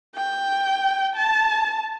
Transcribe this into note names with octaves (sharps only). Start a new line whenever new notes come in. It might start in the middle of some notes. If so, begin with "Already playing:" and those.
G5
A5